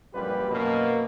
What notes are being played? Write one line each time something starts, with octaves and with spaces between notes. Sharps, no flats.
A#1 F#2 G3 F4 G4 B4
F#2 B2 A#3